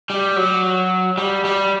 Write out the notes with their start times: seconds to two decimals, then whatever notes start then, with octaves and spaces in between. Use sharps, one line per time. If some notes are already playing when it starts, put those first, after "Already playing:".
0.10 G3
0.36 F#3
1.18 G3
1.45 G3